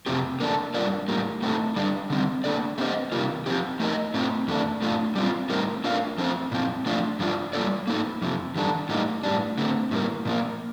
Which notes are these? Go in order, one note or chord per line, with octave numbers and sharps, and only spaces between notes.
F2 C3 F3 C4 G4
A#3 D4 A4
G3 D4 F4 A#4 D5
A2 G3 A#3
A2 A3 C4 D#4 A4
D3 G3 D4
D3 G3 C4
A#3 D4 A4 D5
A3 C4 G4 C5 D#5
C3 D#3 G3 A#3 F4
F3 C4 G4
A3 D#4 A#4 D#5
A2 A3 C4 F4
F2 D3 A3 D4
A2 A3 D4 F4
G3 C4 F4
A2 G3 C4 D#4 A#4
A3 D4 F4 A#4 F5
F3 A3 C4 F4 C5
A#2 F3 C4
F3 A3 D4 F4
G2 F3 A3 D4 F4
G3 A#3 F4 A4 D5
A#3 D#4 A4
F2 C3 F3
D#3 G3 D4 A4
A2 G3 A#3 D#4
A2 G3 D4
D3 A3 C4
A2 G3 A#3
A#2 F3 A#3